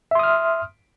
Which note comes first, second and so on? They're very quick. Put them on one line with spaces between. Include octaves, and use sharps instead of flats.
E5 C6 D#6 F6